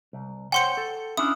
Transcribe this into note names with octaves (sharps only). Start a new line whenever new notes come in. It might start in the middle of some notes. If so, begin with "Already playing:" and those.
C2
C5 C#5 F#5 G5 C6 C#7
A4
C#4 D4 E4 D#6